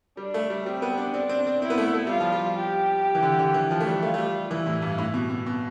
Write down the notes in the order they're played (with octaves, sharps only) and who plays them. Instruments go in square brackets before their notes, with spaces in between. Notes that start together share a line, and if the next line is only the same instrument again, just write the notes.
[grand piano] G3 [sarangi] D4
[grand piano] A3
G3
[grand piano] G3 [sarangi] C4
[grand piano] B3
D4
[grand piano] C4 [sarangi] D4
[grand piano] C4
C4
[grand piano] C4 [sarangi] E4
[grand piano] B3
A3
A3
[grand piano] G3 [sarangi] F4
[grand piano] F3
G3
[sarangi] G4
[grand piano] E3
D3
D3
E3
F3
A3
G3
[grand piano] A3 [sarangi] F4
[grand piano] A3
G3
[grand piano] E3 [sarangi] E4
[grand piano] A2
G2
A2
B2
B2
B2